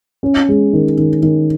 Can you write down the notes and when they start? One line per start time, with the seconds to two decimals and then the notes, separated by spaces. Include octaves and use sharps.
0.23 C#4
0.49 G#3
0.73 D#3
0.98 D#3
1.23 D#3